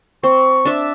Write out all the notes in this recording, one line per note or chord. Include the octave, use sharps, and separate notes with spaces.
C4 C#6
D4 E5